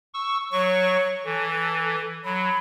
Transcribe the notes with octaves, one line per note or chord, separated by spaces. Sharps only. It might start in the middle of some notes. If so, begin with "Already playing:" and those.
C#6 E6
F#3 C#5 C#6
E3 A4
F#3 B5